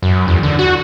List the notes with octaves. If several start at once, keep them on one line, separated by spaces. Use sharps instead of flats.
F#2
E2
D3
F#4